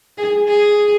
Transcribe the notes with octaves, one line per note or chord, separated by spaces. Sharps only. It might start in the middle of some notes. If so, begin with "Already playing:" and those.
G#4
G#4